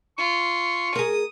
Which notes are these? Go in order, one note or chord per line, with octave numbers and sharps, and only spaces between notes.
F4 C#6
G#4 A#4 D#6